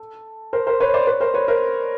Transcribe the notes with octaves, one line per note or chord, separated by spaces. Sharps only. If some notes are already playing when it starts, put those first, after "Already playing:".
Already playing: A4
A#4 C5
A#4 C5
B4 C#5
C5 D5
B4 C#5
A#4 C5
B4 C#5
A#4 C5